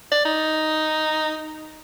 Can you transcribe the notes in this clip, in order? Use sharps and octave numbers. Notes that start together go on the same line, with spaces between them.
D5
D#4